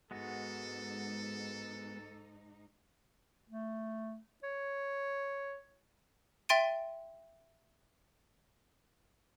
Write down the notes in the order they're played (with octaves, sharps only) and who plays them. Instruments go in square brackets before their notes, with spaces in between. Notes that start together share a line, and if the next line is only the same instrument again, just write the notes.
[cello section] G#2 D#4 [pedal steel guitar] G#3 B3 F#4 [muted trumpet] A4
[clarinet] A3
C#5
[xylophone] E5 G5 C6 A6 D7 D#7